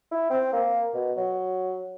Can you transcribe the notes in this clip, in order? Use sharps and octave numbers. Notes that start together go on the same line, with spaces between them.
E4
C4
A#3
B2
F#3